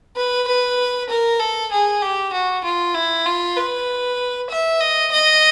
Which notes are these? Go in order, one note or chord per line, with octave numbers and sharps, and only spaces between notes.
B4
B4
A#4
A4
G#4
G4
F#4
F4
E4
F4
B4
E5
D#5
D#5